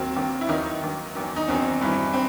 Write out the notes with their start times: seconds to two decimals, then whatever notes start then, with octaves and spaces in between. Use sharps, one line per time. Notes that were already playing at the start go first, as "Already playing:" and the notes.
Already playing: D#2 D#3 F#3 C4
0.16 D#2 D#3 F#3
0.41 E4
0.49 D#2 D#3 F#3 D#4
0.82 D#2 D#3 F#3
1.15 E2 D#3 F#3
1.36 D#4
1.48 E2 D#3 F#3 C4
1.81 G2 E3
2.13 C4